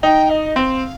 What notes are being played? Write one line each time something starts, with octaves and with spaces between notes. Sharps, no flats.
D#4 G5
D#5
C4 F5